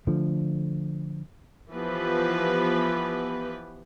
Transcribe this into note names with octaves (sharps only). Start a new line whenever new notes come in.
D3 F3 A3
E3 F3 B3 G4 B4